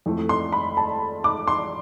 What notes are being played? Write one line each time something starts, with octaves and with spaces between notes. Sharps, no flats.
F2 E3 A3
C6
B5
A5
D6
C6